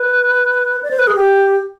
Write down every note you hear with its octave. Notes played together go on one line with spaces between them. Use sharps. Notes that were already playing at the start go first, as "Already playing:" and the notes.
Already playing: B4
D5
C5
B4
G#4
G4